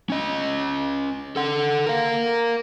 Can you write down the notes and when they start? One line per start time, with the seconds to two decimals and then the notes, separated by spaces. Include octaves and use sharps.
0.10 C#4 D#5
1.36 A4 F#5
1.86 A#4 F5